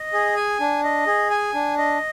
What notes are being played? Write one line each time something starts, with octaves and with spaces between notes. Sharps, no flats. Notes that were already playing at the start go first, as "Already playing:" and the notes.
Already playing: D#5
G#4
G#5
D4
D#5
G#4
G#5
D4
D#5